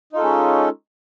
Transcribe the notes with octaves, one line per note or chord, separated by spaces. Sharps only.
G#3 C#4 D#4 F4 A4